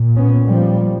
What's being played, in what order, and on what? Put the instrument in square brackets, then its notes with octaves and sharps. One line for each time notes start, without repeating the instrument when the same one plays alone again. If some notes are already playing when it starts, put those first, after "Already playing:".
Already playing: [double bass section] A#2
B3 C#4
F3 G3